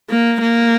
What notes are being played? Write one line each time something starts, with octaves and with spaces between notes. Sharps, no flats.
A#3
A#3